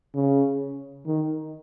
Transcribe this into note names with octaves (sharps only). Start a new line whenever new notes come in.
C#3
D#3